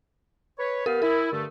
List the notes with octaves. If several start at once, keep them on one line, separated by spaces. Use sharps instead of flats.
B4 C#5
B3 G4 A#4 F5
E4 A#4
G2 D3 A3